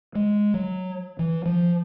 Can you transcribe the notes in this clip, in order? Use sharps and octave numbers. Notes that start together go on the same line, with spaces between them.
G#3
F#3
E3
F3